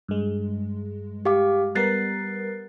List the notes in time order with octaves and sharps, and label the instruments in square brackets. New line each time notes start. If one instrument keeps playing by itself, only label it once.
[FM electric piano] G2 G#3
[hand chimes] G4 F5 D6
[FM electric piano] G3 B3 A#4 [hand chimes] F#6 A6 C7